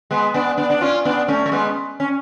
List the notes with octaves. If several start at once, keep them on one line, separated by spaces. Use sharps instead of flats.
G#3 B3
B3 D4
B3 D4
D4
C#4 F4
B3 D4
A3 C#4
A3
G#3 B3
C#4